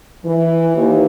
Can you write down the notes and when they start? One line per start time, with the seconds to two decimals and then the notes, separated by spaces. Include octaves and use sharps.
0.25 E3
0.76 D#2